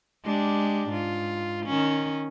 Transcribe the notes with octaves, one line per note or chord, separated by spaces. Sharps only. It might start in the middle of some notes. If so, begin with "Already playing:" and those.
G#3 D4 G4
G#2 F4
D#3 C#4